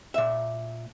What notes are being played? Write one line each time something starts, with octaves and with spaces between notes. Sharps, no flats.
A#2 E5